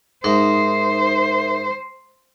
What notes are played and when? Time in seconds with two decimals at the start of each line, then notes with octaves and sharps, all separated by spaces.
0.24 G#2 D#4 A#4 C5 E5